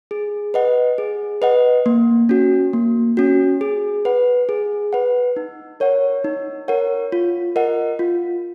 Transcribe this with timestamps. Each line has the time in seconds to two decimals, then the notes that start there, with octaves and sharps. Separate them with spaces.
0.11 G#4
0.54 B4 D#5 F#5
0.98 G#4
1.42 B4 D#5 F#5
1.86 A#3
2.29 C#4 F#4
2.73 A#3
3.17 C#4 F#4
3.61 G#4
4.05 B4 F#5
4.49 G#4
4.93 B4 F#5
5.36 D#4
5.80 A#4 C#5 F#5
6.24 D#4
6.68 A#4 C#5 F#5
7.12 F4
7.56 A#4 D#5 F#5
7.99 F4